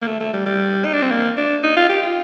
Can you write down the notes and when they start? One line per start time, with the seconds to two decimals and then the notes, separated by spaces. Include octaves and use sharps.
0.02 A#3
0.07 A3
0.20 A3
0.33 G3
0.46 G3
0.85 D#4
0.94 D4
1.02 C4
1.11 A#3
1.37 D4
1.63 D#4
1.77 F4
1.89 G4
2.02 F4